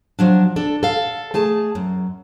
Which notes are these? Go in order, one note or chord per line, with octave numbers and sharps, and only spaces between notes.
F3 F#3 D4
D4 A4
A4 F5
A3 G#4 A5
F#2